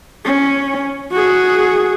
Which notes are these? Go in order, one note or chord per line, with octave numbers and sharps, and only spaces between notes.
C#4
F#4 G#4